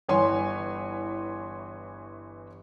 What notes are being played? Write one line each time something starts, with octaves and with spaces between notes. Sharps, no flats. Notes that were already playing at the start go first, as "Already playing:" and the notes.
G1 E3 C#5 G#5 C6